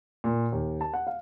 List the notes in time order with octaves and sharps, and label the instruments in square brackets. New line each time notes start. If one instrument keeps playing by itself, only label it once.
[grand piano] A#2
D#2
A5
F#5
F5